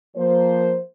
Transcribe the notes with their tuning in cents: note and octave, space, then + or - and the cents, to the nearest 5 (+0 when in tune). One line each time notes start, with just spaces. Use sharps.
F3 +0 A#3 +0 C5 +0